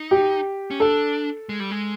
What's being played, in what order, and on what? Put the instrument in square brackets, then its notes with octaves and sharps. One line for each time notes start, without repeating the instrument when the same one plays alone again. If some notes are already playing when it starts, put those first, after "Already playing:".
Already playing: [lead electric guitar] D#4
[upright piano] G4
[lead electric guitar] C#4
[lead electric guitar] D4 [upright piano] A4
[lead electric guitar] G#3
G3
G#3